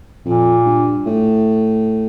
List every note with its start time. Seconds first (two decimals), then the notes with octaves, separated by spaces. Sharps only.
0.24 F2 A#2
0.66 G2
1.06 A2